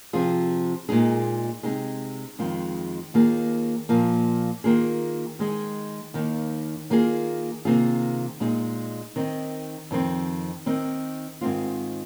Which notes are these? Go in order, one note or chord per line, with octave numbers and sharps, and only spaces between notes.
C3 F3 C4 F4 G#4
A#2 G#3 D#4 G#4
C3 G#3 D#4 G#4
F2 D#3 G#3 F4 G#4
D#2 D#3 A#3 F4 G#4
A#2 F3 A#3
D#3 A#3 F4 G#4
D#3 G#3 D#4 G#4
D#2 D#3 A#3 D#4
D#3 A#3 F4 G#4
C3 D#3 A#3 F4 G#4
A#2 G#3 D#4 G#4
D#3 C4 D#4
F2 D#3 C4
D#3 C4 D#4
G#2 D#3 C4 F4